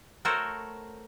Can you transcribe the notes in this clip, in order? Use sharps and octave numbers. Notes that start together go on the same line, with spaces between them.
A3 F#4 A4 A#4 C5 C#5